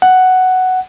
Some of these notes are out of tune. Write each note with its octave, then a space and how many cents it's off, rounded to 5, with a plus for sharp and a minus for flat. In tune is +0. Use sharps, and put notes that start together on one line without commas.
F#5 +5